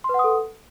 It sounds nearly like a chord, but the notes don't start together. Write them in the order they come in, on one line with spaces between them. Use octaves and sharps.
C6 B4 F#5 D#6 A4